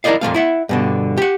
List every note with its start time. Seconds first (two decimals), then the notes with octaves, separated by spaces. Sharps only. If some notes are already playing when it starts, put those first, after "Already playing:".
0.04 E4 A#4 C5 D5 D#5 F5
0.21 F2 A#2 A3 F5
0.34 E4 E5 F#5
0.69 G2 B2 D3
1.17 G4 F#5